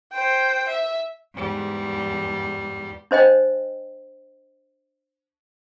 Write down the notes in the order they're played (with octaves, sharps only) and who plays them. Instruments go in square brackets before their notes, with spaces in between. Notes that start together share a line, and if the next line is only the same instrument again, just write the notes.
[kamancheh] C5 G5
E5
[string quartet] E2 G#2 G3
[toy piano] D4 C5 D#5 G5